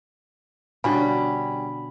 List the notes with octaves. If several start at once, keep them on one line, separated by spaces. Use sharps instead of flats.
B2 D3 G3 C#4 B5